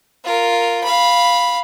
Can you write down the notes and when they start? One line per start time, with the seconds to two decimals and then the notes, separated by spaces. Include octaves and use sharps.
0.25 F4 A#4
0.83 F5 B5